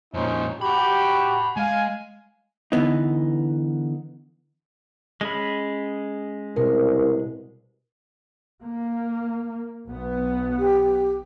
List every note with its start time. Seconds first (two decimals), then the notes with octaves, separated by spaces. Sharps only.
0.14 F2 A#2 C#4 D#4 C5
0.61 F#4 G4 A5 B5
1.57 G#3 F5 G#5
2.72 D3 E3 B3 D#4
5.21 G#3 C#4 G#4 B5
6.56 C2 B2 A#4
8.62 A#3
9.88 B1 B3
10.59 G4